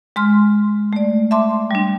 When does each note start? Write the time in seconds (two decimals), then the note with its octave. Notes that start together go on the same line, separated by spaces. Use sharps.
0.16 G#3 C6 F6
0.93 A3 D5
1.31 E5 A5 C6 D6
1.71 G3 D4